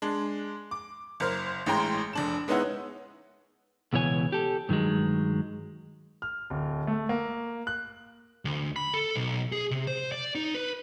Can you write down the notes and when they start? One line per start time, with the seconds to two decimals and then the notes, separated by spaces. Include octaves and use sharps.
0.02 G#3 D4
0.71 D6
1.20 F#1 A#4 C5 F6
1.66 A1 A2 G#3 G5 A#5 C6
2.13 F1 D4 E7
2.48 G#3 B3 C#4 D#4 E4 F#5
3.93 C#2 B2 E3 C#5 G#5
4.32 G4 A4
4.69 G2 D#3 F#3 G#3
6.22 F6
6.50 D1
6.87 A3
7.09 A#3
7.67 F#6
8.45 D2
8.76 B5
8.94 A4
9.16 B1
9.52 G#4
9.71 C3
9.87 C5
10.12 D5
10.35 D#4
10.55 B4